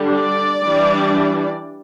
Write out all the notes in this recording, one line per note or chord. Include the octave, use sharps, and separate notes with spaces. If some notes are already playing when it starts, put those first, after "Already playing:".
Already playing: D3 G3 D4
D5
E3 G3 D4